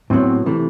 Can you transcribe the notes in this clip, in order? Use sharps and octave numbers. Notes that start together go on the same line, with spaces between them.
A2 F#3 B3 C4
C3 E3 A3